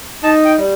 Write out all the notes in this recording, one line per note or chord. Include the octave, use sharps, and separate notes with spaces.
D#4 A5
G5
G3